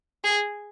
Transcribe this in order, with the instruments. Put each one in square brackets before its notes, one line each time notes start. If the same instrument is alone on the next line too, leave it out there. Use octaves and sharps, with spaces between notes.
[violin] G#4